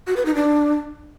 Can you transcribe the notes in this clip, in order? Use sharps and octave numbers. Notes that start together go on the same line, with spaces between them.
F#4
B4
D#4
D4